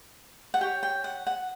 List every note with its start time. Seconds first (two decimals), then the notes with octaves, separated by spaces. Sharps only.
0.54 F#5
0.61 G4 C#5 G5
0.83 G5
1.04 F#5
1.27 F#5